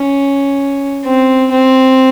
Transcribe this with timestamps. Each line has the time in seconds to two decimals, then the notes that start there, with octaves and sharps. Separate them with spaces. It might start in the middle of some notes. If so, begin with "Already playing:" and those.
Already playing: C#4
1.05 C4
1.52 C4